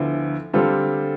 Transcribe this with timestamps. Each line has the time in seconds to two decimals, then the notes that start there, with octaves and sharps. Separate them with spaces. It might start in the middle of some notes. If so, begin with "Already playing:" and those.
Already playing: D2 D3 F3 B3 E4
0.53 D3 G3 C4 F4 A4